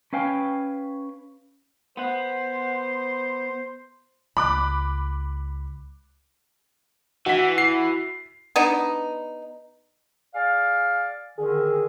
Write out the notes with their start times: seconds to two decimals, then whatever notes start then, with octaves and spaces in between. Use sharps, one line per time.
0.13 C#4 B4 F5 G5 G#5
1.97 B3 C5 F#5
4.37 C#2 B5 D6 F#6
7.26 E3 F#4 B6
7.58 C7
8.56 B3 D4 D#4
10.34 G#4 D5 F5
11.39 D3 D#3 G#4